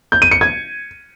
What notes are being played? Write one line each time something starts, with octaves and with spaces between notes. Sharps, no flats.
G6
D#7
C#7
G#6